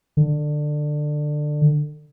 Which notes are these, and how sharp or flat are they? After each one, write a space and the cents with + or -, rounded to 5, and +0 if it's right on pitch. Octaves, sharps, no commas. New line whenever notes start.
D3 +20